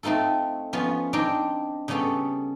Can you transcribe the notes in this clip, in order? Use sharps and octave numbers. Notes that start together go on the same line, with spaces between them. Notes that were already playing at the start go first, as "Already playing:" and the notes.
A3 C4 D#4 F4 A4
F3 B3 C#4 F4
C4 D4 D#4 D5 G5 A#5
C#3 G3 B3 C#4 A4